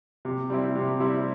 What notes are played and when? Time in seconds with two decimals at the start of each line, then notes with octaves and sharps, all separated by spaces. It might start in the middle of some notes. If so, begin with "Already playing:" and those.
0.25 C3
0.50 G3 C4 E4
0.75 C3
1.00 G3 C4 E4